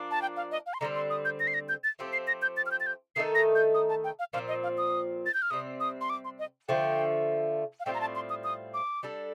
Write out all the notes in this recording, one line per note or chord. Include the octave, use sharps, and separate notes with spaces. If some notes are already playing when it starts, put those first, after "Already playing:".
Already playing: F3 A#3 D4
A5
G5
F5
D#5
F5
C6
D3 G3 C4 A#5
C6
D#6
G6
A#6
C7
A#6
G6
A6
F3 A3 C4 G4
C7
A#6
G6
A6
F6
G6
A6
G6
D#3 A3 D#4 A4 C7
A#6
G6
D#6
A5
G5
F5
A#2 F3 C4 F5
D#5
F5
D#6
A6
G6
F6
C3 G3 C4 D#6
D#6
C6
D6
C6
D#5
D3 F3 A3 G5
F5
A2 G3 C4 F4 G5
A#5
A5
C6
D#6
D#6
D6
G3 D4 A4